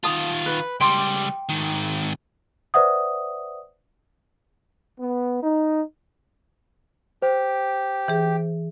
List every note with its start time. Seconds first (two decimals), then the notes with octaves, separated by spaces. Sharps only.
0.04 D#3 F4 A5 D#6
0.46 B4
0.80 C#2 G3 G5 C6 D6
1.49 G#2 D#3
2.74 B4 C5 D5 E5 F#5 D#6
4.99 B3
5.43 D#4
7.22 G4 C5
8.08 E3 G#4